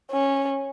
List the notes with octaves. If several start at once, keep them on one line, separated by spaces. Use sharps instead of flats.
C#4